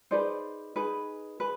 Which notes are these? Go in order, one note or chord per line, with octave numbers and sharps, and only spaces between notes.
D#4 G#4 B4 C5 D5
D#4 G#4 B4
G#4 B4